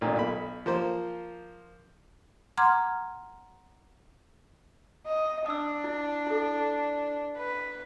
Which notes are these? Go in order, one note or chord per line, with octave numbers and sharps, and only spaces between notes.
A1 D2 A#2 D#3
B1 B5
F3 A#3 C5
F#5 A#5 C6 D6 F6 G#6
D#5
D4 D#6 E6
E4
E4 A4
B4